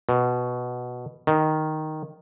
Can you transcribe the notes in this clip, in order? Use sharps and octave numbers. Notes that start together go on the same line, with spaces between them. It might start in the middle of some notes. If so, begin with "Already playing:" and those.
B2
D#3